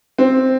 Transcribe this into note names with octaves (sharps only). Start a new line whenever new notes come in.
C4